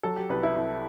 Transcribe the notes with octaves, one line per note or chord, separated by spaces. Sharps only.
F#3 A4
G4
C2 B4
E4
C2